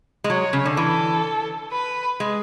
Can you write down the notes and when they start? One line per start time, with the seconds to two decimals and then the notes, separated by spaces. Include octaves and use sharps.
0.24 G#3
0.29 F#3 C#5
0.53 C#3
0.65 D3
0.77 E3 A4
1.72 B4
2.20 G#3